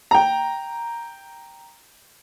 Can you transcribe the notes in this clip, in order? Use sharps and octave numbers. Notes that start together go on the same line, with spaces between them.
G5 A#5